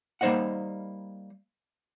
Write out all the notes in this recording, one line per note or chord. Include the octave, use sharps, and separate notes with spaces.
G3 A#3 D#4 C5 D#5 F#5